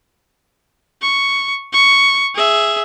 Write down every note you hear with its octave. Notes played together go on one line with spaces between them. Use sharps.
C#6
C#6
G#4 E5